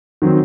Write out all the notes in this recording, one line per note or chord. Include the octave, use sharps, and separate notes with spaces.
D#3 F#3 C4